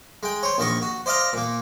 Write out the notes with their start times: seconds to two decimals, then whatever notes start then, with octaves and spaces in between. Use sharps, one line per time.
0.23 G#3 G5
0.43 C5 C#5
0.58 A#1 D#3 D#5 C#6
0.82 F#4
1.06 C5 D5 D#5 F5 A#5
1.33 A#2 A#3